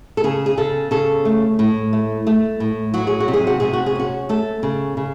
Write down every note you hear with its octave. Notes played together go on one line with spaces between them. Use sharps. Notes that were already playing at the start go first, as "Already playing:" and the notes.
A4
C#3 G#4
G#4
C#3 A4
C#3 A4
A3
A2
A3
A3
A2
F#3 F#4
G#4
F#4
C3
G#4
F#4
C3 G#4
F#4
G#4
C#4 F#4
A3 A4
C#3
C#3